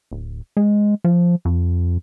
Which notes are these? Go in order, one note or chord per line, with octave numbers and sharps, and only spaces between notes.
D1
G#3
F3
F2